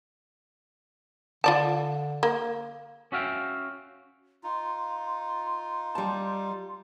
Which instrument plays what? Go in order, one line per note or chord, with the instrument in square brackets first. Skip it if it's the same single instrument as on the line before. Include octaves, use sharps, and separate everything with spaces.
[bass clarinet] D3 [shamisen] F4 D5 A5
[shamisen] A#3
[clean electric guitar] C#4 F#4 E5 F5 G5
[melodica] D#4 F4 [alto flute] C6
[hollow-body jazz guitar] G3 A5